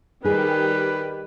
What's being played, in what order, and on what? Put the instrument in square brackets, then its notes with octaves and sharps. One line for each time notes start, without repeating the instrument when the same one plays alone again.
[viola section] D#3 G3 G4 [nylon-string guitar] D#4 G#4 [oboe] B4